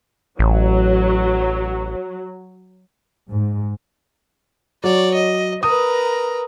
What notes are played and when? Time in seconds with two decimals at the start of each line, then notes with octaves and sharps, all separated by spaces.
0.39 A1 F#3
3.30 G#2
4.84 F#3 C#5 D5
5.15 D#5
5.63 A#4 B4 D#6